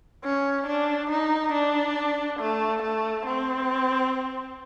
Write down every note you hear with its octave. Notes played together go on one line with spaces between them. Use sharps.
C#4
D4
D#4
D4
A3
A3
C4